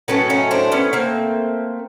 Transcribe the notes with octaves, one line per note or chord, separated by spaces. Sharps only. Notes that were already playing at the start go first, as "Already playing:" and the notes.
A2 F#3 A3 B3 C#4
C#4 D#4
C4 D4
B3 C#4
A#3 C4